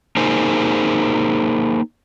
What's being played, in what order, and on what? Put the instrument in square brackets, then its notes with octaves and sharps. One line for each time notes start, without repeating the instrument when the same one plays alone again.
[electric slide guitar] A#3 D#4 G#4 A#4 C5